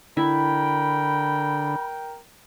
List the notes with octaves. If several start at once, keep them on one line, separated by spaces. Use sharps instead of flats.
D3 E4 A#4 G5 B5